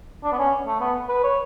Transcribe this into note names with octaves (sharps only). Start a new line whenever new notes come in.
D4
B3
C#4
A3
B3
B4
C#5